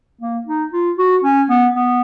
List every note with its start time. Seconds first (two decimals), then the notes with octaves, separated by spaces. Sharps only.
0.21 A#3
0.47 D#4
0.73 F4
0.98 F#4
1.24 C#4
1.49 B3
1.75 B3